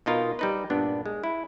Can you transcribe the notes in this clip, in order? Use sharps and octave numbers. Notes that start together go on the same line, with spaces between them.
B2 D#4 F4 A#4
G3 D#4 B4
G2 A#2 B3 D4
G#3
E4